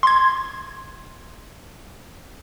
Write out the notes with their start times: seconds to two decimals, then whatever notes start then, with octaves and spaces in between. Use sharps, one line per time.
0.03 C6 G#6